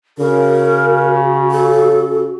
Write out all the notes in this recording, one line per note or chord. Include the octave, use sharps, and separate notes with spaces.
C#3 F#4 A#4
A4